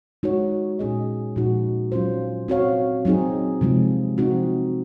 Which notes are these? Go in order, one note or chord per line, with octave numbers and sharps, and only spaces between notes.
G#3 D#4 F#4 C#5
A#2 G#3 C#4 G#4 D#5
A#2 F3 G#3 D#4 F#4
F#3 C#4 F4 C5
C4 F#4 C#5 F5
F#3 C4 D#4 G#4
C3 F3 G#3
F3 C4 D#4 F#4